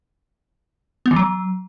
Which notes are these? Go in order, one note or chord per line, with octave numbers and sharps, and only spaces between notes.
B3
E3
F#3